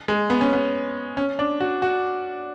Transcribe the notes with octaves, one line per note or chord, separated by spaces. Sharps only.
G#3
B3
C#4
B3
C#4
D4
F#4
F#4